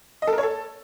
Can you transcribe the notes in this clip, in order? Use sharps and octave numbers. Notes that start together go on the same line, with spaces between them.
D#5
A4
A#4
C#5
A4